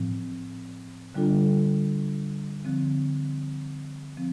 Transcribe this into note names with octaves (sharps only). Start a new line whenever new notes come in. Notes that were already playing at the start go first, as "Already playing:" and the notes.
Already playing: A2 F3 C4
D3 G3 D4 F4 A4
D3 F3 C4
F3 C4